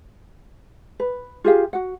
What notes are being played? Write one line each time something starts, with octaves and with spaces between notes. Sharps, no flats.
B4
F4 G4 G#4 F5
F#4 F#5